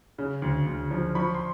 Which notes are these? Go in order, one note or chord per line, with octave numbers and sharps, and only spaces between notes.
C#3
D2
D2
F3
F3 B5 C#6
C6